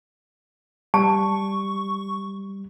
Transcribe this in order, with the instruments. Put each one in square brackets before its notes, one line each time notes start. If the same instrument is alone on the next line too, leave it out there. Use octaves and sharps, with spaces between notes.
[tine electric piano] G3 [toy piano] A5 [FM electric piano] C#6